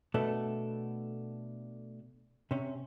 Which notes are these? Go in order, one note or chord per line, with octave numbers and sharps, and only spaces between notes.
B2 A3 B3 D4 A4
C3 C#4